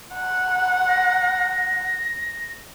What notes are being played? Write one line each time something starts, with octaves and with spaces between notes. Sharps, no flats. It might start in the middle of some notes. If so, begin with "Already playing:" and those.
F#5
A#6